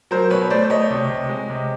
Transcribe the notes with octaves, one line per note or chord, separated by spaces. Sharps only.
F#3 A#4 C5
B2 B4 C#5
A3 C5 D5
A3 C#5 D#5
C3
C3
G#3
C3